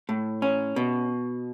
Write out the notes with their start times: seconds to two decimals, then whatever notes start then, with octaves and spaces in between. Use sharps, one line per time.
0.09 A2
0.42 C#4
0.76 B2